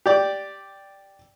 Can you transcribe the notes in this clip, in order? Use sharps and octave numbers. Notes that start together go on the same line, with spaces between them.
G4 D5